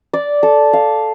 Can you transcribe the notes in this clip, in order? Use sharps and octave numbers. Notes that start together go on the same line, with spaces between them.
D5
A4
F5